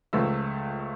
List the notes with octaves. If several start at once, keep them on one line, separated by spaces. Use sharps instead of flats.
C#2 C#3 F3 A3 E6